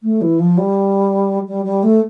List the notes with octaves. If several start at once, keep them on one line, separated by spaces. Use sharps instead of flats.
A3
E3
F3
G3
G3
G3
A3